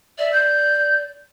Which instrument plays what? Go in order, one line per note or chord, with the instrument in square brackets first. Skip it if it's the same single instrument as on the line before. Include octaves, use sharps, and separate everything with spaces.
[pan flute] D5 [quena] E5
[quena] G6